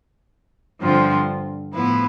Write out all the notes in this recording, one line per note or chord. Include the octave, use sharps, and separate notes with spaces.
G2 D3 F3 C4 F4
A2 F3 B3 E4 B4